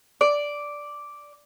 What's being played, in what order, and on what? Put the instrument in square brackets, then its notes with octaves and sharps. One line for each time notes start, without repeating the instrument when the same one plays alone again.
[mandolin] D5